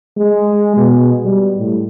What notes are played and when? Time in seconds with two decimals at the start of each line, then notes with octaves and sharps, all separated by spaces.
0.17 G#3
0.77 B2
1.25 G3
1.58 A2